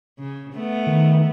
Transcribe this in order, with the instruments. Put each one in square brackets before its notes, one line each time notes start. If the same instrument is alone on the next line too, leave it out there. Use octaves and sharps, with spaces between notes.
[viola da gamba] C#3
A3 B3
[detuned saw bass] D#3